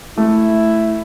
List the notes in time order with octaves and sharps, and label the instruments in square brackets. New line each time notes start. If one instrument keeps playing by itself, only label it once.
[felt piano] A3 [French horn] E4